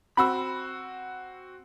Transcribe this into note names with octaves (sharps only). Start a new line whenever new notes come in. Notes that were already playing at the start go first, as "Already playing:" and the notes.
C4 F#4 B5 E6